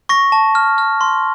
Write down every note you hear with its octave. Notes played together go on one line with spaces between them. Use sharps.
C#6 A#6
A5
F6
F6
C6